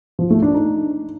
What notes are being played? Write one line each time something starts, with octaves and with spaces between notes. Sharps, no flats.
F3
A3
D4
D#4